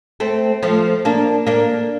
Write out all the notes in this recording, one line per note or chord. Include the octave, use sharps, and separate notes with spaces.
A3 C4
F3 A3
A#3 D4
A#3 D4